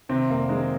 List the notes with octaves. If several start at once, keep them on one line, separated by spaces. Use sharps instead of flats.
C3 D#3 C4
F1 A#3
D#3 G#3